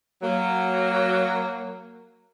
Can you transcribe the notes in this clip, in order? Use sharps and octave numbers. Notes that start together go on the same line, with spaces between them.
F#3 A#3